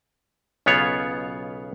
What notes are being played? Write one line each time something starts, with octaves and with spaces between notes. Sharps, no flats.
B1 C#3 B3 F4 C#5 F#5